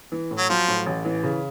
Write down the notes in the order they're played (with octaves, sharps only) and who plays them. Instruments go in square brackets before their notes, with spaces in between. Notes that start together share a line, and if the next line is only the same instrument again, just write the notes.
[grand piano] E3
A2
[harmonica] F#3
[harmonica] F3 [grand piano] F#3
[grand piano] A2
A1
E3
C#3